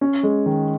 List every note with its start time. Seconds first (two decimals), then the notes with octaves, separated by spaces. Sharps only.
0.01 C#4
0.23 G#3
0.46 D#3